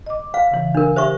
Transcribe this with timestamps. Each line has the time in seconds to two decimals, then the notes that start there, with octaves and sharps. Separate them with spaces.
0.06 D#5 D6
0.34 F5
0.51 C#3 E3
0.75 D4 A#4
0.96 G4 C5 E5 C#6